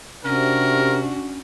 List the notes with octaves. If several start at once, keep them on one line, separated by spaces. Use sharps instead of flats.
C3 C#4 D4 F#4 A#4